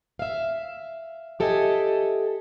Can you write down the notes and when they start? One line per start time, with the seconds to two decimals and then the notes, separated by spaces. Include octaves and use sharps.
0.19 E5 F5
1.40 G4 A4 D#5 E5 G#5